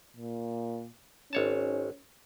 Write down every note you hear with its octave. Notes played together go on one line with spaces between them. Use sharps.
A#2
G#1 C#4 C#5 A5